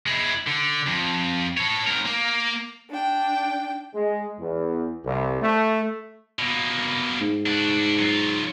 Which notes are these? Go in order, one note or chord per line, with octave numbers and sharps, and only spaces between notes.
G#3 E4
D3
F2
A4 C#5
G#2 A#4
A#3
D4 G5
G#3
E2
C2
A3
B2 A#3
G#2
D4 F#4
F#3 F4